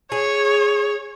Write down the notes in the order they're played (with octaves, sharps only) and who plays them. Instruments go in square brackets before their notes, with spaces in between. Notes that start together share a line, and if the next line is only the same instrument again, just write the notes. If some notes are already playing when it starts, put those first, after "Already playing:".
[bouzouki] G#4 [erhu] C#5